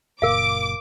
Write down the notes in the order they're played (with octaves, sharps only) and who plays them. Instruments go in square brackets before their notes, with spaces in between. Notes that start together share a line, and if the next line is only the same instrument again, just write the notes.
[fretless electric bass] F#1 A#2 [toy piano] A#4 F5 [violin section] D6